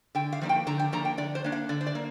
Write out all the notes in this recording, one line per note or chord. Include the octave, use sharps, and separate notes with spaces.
D3 G5
F5
F3 A#3 D4
G5
D3 A#5
G5
F3 A#3 D4 A#5
G5
D3 D5
C5
A#3 D4
F5
D3 D5
C5
D5
A#3